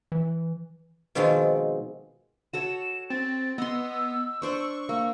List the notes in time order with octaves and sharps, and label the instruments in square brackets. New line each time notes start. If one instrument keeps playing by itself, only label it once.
[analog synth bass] E3
[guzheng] B2 D#3 F3 G#3 C4
[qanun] F#4 A4 C#5 [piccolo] E7
[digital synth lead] C4 [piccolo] A6
[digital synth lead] B3 [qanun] D#5 C6 [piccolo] E6
[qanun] D4 C5 D5 [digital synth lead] C#6
[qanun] A#3 [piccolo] E6